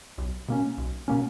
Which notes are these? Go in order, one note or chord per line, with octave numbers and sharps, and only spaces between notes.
B1
B2 A#3 C#4
B1
B2 A#3 C#4